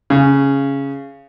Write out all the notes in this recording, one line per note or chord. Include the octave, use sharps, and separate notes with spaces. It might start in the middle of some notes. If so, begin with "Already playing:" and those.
C#3